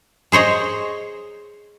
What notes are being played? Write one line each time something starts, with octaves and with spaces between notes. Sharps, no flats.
G#4 C5 C#5 D#5